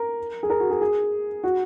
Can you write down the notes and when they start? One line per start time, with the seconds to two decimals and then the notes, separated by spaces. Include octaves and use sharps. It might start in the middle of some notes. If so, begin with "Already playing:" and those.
Already playing: A#4
0.43 G#4
0.50 A#4
0.60 F#4
0.71 G#4
0.81 G#4
1.43 F#4